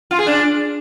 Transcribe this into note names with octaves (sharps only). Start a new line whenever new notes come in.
F4
G#4
D4